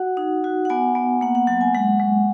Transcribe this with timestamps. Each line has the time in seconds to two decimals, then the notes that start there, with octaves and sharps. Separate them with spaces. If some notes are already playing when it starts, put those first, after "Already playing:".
Already playing: F#4 F#5
0.17 D#4
0.44 F#4
0.65 F#5
0.70 B3 G#5
0.95 B3
1.21 A#3 F#5
1.35 F#5
1.47 F#3 F#5
1.61 G#5
1.75 G#3 F#5
1.99 G#3